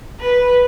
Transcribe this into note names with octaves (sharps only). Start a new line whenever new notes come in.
B4